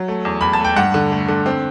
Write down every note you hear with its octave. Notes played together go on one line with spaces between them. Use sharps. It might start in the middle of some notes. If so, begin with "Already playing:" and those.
Already playing: F#3
A3
E2
E2 B5
A5
A3 G5
G2 F#5
D3
A3
D3
C4